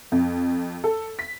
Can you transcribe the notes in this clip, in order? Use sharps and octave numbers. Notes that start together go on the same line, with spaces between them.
F2
A4
B6